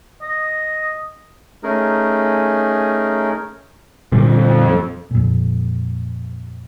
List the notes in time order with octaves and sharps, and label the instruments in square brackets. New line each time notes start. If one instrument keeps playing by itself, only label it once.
[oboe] D#5
[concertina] A3 C#4 D#4 G#4 A#4
[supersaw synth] F2 [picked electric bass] A#2 D3 G3
[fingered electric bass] F2 A#2